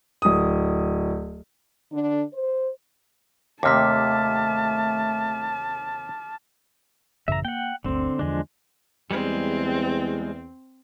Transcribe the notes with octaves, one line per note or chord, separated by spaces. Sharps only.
D1 D#6
D3 D4
C5
D#2 C3 A3 A5 D6 F6 B6
A1 F#2 C#3 E5 A#5
A#3 F#5 G5
G1 D2 D3 C4
E2 D3 F3 G#3 D4
E2 G3 G#3 C4